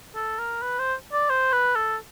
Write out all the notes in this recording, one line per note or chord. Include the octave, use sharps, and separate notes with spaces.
A4
A#4
B4
C5
D5
C5
B4
A4